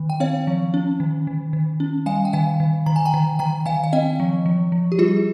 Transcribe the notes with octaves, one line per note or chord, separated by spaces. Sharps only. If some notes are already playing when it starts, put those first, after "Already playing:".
Already playing: D#3
G5
C4 C#5 F5
F3
C#4
D#3
D#3
D#3
C#4
G3 F5 G#5
G5
D#3 F5 G#5
D#3
D#3 A#5
G#5
G5 A#5
D#3
D#3 G5 A#5
D#3 F5 G#5
F5
C4 D#5 G5
F3
F3
F3
G4
G3 F4 G#4